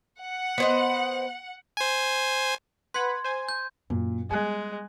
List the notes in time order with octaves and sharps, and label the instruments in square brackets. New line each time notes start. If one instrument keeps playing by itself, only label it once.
[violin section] F#5
[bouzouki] B3 C5 D#5
[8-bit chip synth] C5 G#5
[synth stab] B4 F#5 B5 [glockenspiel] C6 G#6
[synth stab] C5 G#5
[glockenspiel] G6
[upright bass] F#2 [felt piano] A#2
[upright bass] G3 B3 [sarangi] G#3 [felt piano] G#5 F#6